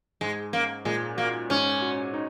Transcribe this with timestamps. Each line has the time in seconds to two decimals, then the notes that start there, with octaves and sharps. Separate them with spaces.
0.21 G#2 G#3
0.53 A#3 C#4
0.85 A#2 G#3
1.17 A#3 F#4
1.50 G#2 C#4
1.82 F#4
2.14 D#4